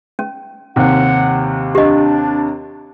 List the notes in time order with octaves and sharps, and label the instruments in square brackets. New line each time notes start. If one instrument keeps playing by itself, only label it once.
[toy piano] C#4
[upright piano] D#2 C3 [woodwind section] F#5
[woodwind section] D4 [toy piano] G4 D#5